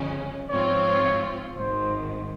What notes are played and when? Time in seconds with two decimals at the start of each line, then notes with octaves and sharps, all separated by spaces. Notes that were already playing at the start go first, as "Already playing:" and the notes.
Already playing: G1 F2 C#3 G#3 C#4
0.50 G#2 F3 C4 F4 C#5
1.56 G#1 G#2 D#3 C5